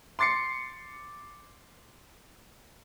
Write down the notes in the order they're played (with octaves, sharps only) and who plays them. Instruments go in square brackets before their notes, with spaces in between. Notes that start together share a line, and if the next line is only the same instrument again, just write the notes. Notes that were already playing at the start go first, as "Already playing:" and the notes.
[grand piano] C6 D6 A6 C7 C#7